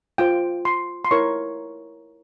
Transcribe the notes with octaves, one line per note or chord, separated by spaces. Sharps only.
F4 C5 G5
C6
C6
E4 A#4 C#5 C#6